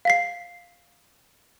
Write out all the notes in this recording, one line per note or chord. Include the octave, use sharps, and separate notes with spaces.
F5 B6 C7